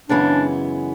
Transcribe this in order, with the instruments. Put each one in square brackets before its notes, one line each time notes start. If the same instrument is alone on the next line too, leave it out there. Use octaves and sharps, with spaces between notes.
[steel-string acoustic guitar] F#2 C#3 E3 G#3 B3 [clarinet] D4